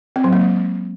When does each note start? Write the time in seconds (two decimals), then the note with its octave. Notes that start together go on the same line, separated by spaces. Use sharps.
0.16 C4
0.24 F#3
0.33 A#3
0.41 G#3